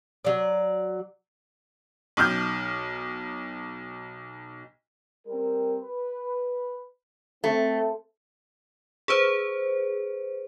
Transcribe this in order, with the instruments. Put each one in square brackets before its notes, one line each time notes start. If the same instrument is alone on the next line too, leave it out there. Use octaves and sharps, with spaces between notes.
[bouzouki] F#3 D5
[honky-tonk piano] B1 D6 F6 G6
[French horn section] G3 C4 A#4
B4
[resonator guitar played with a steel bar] A3 [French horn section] C4
[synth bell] G#4 B4 C5